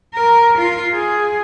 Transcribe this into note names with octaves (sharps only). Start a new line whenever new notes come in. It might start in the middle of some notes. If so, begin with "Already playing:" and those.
A#4
F4
G#4